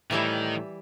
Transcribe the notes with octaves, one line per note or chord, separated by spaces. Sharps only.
A2 D#3 E3 G3 E4